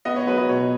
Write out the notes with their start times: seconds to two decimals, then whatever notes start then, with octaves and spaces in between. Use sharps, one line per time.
0.05 B3 D#5
0.16 C#5
0.27 F#3 B4
0.38 D#5
0.49 B2 C#5